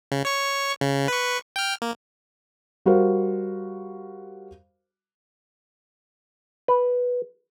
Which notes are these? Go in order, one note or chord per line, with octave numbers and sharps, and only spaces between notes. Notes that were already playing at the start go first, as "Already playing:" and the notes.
C#3
C#5 C#6
C#3
B4 C#6
G5 F6
A#3
G3 F#4 A#4 C5 F5
B4